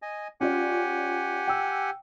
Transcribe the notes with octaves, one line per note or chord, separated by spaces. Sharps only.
D#5 G#5
C#4 F4 G4 D5 F#5 G#5
G5 E6